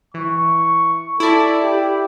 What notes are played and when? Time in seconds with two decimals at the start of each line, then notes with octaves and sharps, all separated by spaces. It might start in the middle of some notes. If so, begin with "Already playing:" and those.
0.14 E3 C#6
1.20 E4 A4 D5
1.63 G4